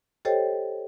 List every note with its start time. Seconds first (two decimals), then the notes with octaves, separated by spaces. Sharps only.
0.25 G4 A4 C5 C#5 D#5 G5